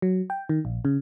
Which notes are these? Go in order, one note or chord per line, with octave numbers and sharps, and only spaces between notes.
F#3
G5
D#3
A#1
C#3